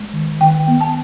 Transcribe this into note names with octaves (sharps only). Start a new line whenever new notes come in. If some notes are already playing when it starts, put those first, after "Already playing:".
Already playing: G#3
D#3
D#3 G5
B3
A5